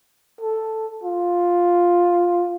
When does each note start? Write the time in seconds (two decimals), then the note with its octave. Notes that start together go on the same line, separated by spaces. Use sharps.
0.41 A4
1.04 F4